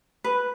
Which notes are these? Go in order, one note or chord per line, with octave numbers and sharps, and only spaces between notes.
B4